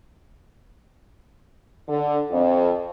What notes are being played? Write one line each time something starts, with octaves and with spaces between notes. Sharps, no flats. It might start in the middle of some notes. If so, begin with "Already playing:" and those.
D3
F2